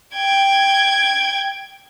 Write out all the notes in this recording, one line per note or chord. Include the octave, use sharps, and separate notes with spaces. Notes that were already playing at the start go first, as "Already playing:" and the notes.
G5 G#6